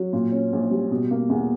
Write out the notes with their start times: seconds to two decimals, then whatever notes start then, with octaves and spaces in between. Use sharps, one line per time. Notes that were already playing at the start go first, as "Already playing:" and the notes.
Already playing: F#3
0.13 A#2
0.32 C#4
0.53 A#1
0.71 G3
0.90 B2
1.11 A#3
1.29 E2